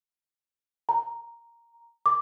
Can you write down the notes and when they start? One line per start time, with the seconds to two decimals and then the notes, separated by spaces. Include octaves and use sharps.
0.89 A#5
2.06 D6